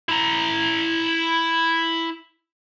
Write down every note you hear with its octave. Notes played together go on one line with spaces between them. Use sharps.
E4 A#5